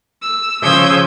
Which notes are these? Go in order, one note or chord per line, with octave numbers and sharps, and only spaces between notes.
E6
C#3 F3 D#6 E6 G6 G#6